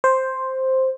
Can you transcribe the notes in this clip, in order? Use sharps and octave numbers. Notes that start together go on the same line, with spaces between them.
C5